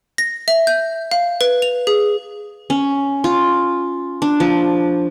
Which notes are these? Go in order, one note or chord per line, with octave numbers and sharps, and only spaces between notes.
A#6
E5
G6
F5
B4
F7
G#4
C#4
F4
D4
F3